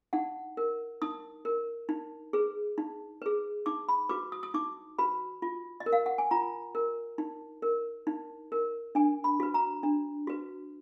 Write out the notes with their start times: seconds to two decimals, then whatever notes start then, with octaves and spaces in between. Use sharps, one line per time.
0.13 D#4 F#5
0.57 A#4
1.02 D#4 D#6
1.45 A#4
1.89 D#4
2.33 G#4 B4
2.78 D#4
3.22 G#4 B4
3.66 D#4 D6
3.89 B5
4.09 F#4 B4 D6
4.32 D#6
4.43 D#6
4.54 D#4 D6
4.98 F#4 B4 B5
5.42 F4
5.80 D#5
5.86 A#4
5.93 F5
6.06 F#5
6.18 G#5
6.31 F4 A#5
6.75 A#4
7.18 D#4
7.62 A#4
8.07 D#4
8.52 A#4
8.95 D4 G#5
9.24 B5
9.40 F#4 B4
9.54 A#5
9.83 D4
10.27 F#4 B4